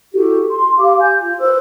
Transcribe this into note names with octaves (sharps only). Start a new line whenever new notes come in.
E4 F#4 G4 A4
C6
G4 F5 D6
G#5 G6
F4
B4 C5 E6